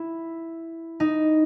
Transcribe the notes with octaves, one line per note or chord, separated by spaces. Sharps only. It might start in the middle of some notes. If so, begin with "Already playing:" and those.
Already playing: E4
D#4